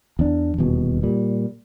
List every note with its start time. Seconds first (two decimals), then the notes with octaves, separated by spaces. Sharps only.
0.19 E2 D4
0.58 D#1 E2 B2
1.03 A#2 G3